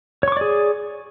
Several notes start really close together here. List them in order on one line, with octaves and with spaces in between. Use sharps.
C#5 C#6 D6 D5 G#4